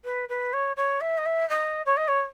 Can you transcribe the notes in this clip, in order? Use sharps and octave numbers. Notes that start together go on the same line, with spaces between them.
B4
B4
C#5
C#5
E5
D#5
E5
D#5
C#5
D#5
C#5